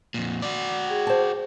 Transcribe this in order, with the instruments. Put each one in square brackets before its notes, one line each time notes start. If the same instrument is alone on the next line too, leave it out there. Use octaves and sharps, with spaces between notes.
[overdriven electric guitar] F2 A#2
F#4 D5
[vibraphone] G#4 G5
[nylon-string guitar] C5 A5